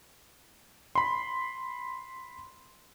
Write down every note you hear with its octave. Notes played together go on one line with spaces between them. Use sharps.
B5 C6